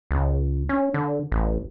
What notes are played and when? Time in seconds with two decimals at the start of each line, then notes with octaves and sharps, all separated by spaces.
0.11 C#2
0.69 C#4
0.94 D3
1.32 A1